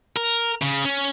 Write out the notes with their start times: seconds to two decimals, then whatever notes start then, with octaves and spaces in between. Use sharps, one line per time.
0.16 A#4
0.62 C#3
0.85 C#4